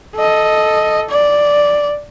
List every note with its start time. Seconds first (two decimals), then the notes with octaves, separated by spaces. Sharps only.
0.16 A4 D#5
1.09 D5